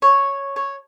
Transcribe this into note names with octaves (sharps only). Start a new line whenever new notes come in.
C#5
C#5